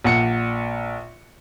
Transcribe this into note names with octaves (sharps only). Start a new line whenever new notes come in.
A#1 F#5 C#7